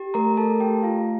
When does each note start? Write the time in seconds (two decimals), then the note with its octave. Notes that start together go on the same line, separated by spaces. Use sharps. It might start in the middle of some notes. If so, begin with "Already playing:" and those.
Already playing: G4
0.14 A3 A#4 A#5
0.37 A3 A4 A5
0.60 A3 G4 G5
0.83 A3 F4 F5